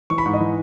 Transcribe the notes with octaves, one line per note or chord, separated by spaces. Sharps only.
E3 C#6
B5
G#2 C#6
D#5
E3